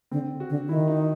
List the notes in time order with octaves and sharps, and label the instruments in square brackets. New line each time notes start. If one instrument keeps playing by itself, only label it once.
[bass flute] D3 [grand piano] C4
[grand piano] F#4
[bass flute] D3
[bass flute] D#3 [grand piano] E4
[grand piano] D#4